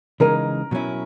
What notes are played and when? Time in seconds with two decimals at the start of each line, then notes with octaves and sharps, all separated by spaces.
0.20 C#3 E3 G#3 D#4 A#4
0.71 B2 F#3 C#4 E4